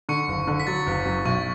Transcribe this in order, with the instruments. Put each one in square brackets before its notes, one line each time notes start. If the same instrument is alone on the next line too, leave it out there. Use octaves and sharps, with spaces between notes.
[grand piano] D3 [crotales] C#6 C#7
[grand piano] F#1
D3
[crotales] B6
[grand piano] F#3 [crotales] A6
[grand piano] F#1
F#2
[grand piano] B1 [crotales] C#6